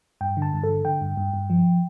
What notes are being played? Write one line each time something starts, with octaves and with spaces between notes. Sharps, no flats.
G2 G5
D3
A5
G2
A4
D3
D3 G5
G2
G2
G2
F3